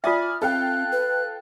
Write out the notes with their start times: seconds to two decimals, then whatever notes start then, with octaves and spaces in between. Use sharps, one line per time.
0.04 F4 D5 E5 G#5 D#6 F6
0.42 C4 A4 F5 G5 F#6
0.92 B4